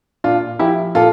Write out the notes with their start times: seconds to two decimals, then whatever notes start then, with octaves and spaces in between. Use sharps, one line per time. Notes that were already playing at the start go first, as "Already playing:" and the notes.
0.24 A#2 D4 F4
0.59 F3 E4 G4
0.95 A#2 F4 A4